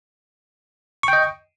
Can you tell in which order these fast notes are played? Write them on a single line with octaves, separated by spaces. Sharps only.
C#6 G5 D#5